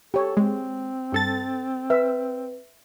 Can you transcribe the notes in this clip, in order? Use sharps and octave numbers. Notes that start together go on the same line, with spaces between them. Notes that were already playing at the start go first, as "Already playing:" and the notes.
G4 A4 C#5
G#3 C4
G2 A4 A6
B4 E5